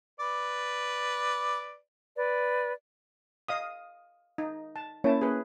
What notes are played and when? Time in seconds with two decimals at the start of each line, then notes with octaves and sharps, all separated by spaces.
0.20 B4 D5
2.16 B4 D5
3.48 D#5 F5 D#6
4.38 D#4
4.76 A5
5.04 A#3 C#4 E4 C#5 A5
5.21 G#4 B4